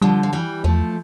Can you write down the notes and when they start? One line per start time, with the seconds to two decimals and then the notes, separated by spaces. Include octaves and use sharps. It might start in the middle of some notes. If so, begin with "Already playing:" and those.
0.02 D3 F3 G3
0.23 F3
0.33 E3 G3
0.64 E2 F3 A3